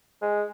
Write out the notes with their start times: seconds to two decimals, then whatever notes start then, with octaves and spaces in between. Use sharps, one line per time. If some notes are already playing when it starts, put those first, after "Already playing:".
0.22 G#3